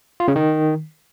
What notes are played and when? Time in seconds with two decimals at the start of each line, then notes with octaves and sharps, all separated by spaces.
0.20 F4
0.28 C#3
0.36 D#3